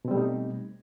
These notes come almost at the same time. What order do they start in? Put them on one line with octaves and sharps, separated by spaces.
B2 C4 G3 A3 D#4